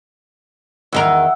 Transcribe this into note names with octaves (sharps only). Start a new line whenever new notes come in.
E2 D#3 A#4 E5 F#5